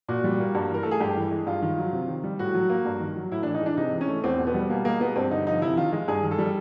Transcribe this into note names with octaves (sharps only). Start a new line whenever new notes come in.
A#2 F#4
G3
A#3
G2
E3 A#4
A3 A4
G#4
G2 G4
E3
G#3
G2 F4
D#3
F#3
C3
D#3
G3
A2 F#4
F#3
A#3
G2
D#3
F#3
A2 E4
D4
E3
D#4
G#3 D4
C3 D#4
E3
C#4
A3
E2 C4
B2
B3
G3
B2 A#3
G#3 A#3
B2 B3
G2 C4
D3 D#4
F3 D#4
C3 E4
D#3 F4
G#3
G2 G#4
D#3
A4
G3